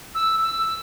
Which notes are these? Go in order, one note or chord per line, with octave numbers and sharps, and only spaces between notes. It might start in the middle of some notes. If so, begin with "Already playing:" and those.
E6
E6